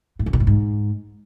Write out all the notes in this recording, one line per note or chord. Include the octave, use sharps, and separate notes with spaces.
A2
F#2
B2
A2
G#2